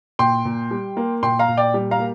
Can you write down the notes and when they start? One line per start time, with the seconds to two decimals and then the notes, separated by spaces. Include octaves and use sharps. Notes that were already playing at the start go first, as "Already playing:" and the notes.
0.19 A#2 G5 C6
0.45 A#2
0.71 G3
0.97 A#3
1.23 A#2 G5 C6
1.39 F5 A#5
1.48 A#2
1.57 D5 G5
1.74 G3
1.91 F5 A#5
1.99 A#3